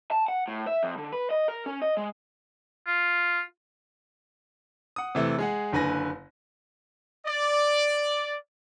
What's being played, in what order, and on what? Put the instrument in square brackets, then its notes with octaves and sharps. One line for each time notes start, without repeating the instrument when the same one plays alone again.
[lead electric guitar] A5
F#5
A2
E5
F2
D3
B4
D#5
A#4
C#4
D#5
G#3
[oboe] F4
[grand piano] F#5 D#6
C3 E3 A3
G#3 G#4 F#5
F#1 D3 B4 G#5 A#6
[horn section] D5